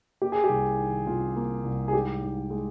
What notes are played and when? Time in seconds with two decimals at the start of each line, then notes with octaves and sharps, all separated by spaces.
0.21 A#3 G4
0.32 G#4
0.44 G4
0.49 C2
0.78 D#3
1.07 C3 F4
1.36 A#3
1.64 C2
1.88 G#4
1.93 G#2 G4
2.22 G#2
2.50 G#3